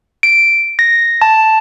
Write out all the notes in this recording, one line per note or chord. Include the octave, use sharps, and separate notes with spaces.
D7
A#6
A5